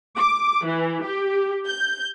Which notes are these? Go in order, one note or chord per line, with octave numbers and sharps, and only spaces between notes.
D6
E3
G4
G6